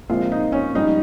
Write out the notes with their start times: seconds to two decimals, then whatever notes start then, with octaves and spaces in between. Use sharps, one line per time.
0.10 A#1 A#2 G#3 C4 F4
0.32 D#4
0.52 C#4
0.75 A#1 G#2 G3 C#4 D#4